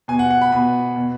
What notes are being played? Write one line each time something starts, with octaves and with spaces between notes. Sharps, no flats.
B2 G#5
F#5
F#5
B5
B2 B5
B2